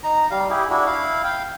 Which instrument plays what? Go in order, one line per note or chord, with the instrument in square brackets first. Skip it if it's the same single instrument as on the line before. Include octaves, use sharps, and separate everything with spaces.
[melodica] D#4 A#5
G3 F5
E4 G4 G#4
D4 E4 F#4
E4 F5
F5 G5